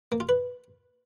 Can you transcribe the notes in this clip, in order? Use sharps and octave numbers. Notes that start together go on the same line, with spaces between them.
A#3
F4
B4